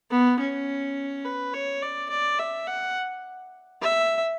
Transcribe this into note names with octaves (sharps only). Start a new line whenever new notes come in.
B3
C#4
B4
C#5
D5
D5
E5
F#5
E5